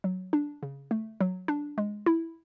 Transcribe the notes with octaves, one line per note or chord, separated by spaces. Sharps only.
F#3
D4
C#3
A3
F#3
D4
G#3
E4